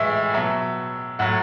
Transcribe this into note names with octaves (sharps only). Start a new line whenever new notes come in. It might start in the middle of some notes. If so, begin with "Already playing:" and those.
Already playing: A2 E3 G#3 E5
B2 F#3 E5
A2 F#3 F#5